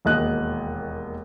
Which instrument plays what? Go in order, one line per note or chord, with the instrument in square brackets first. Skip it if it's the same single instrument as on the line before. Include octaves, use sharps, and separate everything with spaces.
[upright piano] E1 D#2 D#5 F#6